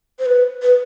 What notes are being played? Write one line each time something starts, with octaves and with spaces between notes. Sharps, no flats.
C5
B4
B4